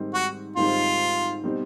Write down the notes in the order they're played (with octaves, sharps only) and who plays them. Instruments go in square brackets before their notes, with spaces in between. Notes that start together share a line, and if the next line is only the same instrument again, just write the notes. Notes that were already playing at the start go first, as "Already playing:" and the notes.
Already playing: [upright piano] G#2 D#3 G3 C4
[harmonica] F#4
[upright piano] G#2 D#3 G3 C4 [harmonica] F4
[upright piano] B2 G3 C4 D#4